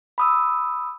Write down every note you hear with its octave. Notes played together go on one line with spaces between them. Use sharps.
B5 D#6 E6